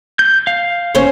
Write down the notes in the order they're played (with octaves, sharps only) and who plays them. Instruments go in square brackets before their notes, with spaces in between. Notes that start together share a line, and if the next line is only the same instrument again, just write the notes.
[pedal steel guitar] G6
F5
[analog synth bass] F#1 [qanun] C#4 C5 C#5